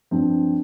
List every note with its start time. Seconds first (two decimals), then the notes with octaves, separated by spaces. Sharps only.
0.11 G2 F3 C4